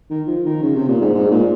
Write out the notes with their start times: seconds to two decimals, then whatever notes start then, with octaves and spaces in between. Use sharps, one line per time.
0.10 D#3
0.27 F3
0.45 D#3
0.62 C#3
0.75 C3
0.88 A#2
1.01 G#2
1.14 G#2
1.31 A#2